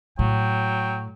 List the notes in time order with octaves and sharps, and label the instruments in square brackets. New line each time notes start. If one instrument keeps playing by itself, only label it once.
[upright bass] A2 [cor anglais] F#3 [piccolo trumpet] G5